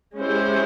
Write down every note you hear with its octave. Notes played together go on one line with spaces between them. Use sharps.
G#3 C#4 E4 G4 C5